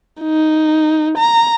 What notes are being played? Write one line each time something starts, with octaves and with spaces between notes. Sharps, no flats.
D#4
A#5